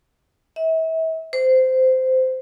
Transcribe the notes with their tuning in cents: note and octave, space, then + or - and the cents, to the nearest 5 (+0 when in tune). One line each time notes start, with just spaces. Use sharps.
E5 -35
C5 -15